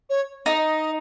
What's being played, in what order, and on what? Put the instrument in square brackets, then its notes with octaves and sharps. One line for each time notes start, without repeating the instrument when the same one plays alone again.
[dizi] C#5
[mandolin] D#4 [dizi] D#5